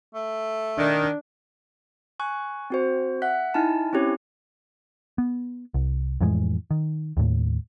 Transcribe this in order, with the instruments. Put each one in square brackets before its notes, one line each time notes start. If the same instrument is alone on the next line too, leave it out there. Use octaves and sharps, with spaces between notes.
[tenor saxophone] A3
[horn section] D#3 [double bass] D4
[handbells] G#5 C#6 F#6
C4 F#4 C5
E5 F#5 F#6 B6
D#4 E4 G#5 A5
C4 C#4 E4 G4 C#5
[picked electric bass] B3
C2
F2 A2 E3 G#3
D#3
D#2 A2